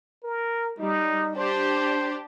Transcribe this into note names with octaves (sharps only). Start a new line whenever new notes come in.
A#4
G3 D#4
D4 G4 C5